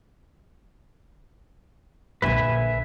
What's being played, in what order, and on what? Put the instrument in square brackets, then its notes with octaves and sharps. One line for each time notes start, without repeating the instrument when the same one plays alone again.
[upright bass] A#1 D3 [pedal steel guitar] B4 E5 G#5